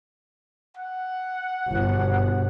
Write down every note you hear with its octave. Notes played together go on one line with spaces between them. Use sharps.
F#5
G1 B2